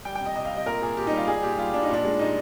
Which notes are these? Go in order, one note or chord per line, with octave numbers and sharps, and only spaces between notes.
G3 G5
G5
C3
D#5
C3 D#5
F5
C3
D#5
A#2 A#4
A#2 G#4
A#2 G4
D#4
G3
F4
G3 G#4
A#2 G4
G3 F4
G3 D4
D#4
A#2 D4
G#3
A#2 D#4